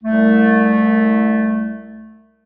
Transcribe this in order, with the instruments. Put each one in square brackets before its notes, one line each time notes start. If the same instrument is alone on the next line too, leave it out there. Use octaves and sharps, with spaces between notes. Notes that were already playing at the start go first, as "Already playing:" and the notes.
[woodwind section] C2 A3